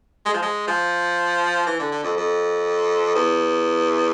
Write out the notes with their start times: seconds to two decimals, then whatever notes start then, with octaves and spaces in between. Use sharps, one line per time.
0.26 G#3
0.34 F3
0.42 G#3
0.68 F3
1.66 E3
1.79 D3
1.91 D3
2.04 F2
2.17 F2
3.15 E2